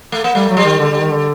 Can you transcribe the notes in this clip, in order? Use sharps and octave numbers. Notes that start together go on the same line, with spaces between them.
A3
A#3
G3 A3
F#3
G3
D#3
D3
D3
D#3
D3